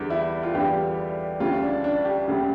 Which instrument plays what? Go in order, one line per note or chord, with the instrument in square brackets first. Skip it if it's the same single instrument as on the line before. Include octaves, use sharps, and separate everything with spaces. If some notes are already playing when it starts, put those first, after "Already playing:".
Already playing: [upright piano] E2 D3 G3 G4
E4
F4
E2 D3 G3 G4
D2 C#3 G3 F4
D4
D4
G4
D2 C#3 G3